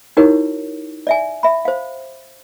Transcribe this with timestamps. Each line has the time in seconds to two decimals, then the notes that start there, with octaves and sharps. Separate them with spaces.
0.17 D#4 E4 F#4 G4 A#4 C#5
1.07 D5 E5 G#5
1.43 E5 B5
1.65 C5 F5